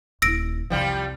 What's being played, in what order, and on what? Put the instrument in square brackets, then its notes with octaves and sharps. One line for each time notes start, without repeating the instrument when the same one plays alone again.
[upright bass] D#1 E4 [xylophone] E6 A#6 D7
[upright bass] C2 F2 [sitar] F3 G3 F4